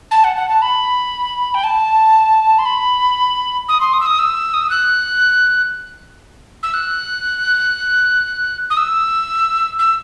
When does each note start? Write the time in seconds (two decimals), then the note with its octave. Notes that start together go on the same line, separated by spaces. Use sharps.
0.11 A5
0.24 F#5
0.36 F#5
0.49 A5
0.62 B5
1.54 G5
1.63 A5
2.58 C6
2.65 B5
3.68 D#6
3.80 C6
3.93 D#6
4.00 E6
4.06 D#6
4.19 E6
4.54 D#6
4.61 E6
4.70 F#6
6.63 E6
6.74 F#6
8.70 D#6
8.77 E6
9.79 E6